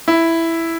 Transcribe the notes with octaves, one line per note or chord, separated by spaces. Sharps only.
E4